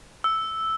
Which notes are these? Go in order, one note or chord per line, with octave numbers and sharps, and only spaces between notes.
E6